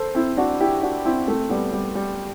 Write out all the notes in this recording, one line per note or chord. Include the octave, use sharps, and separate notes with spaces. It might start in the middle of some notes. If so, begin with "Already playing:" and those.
Already playing: A4 C5
C4 E4
D4 F#4
E4 G4
D4 F#4
C4 E4
A3 C4
G3 B3
G3
G3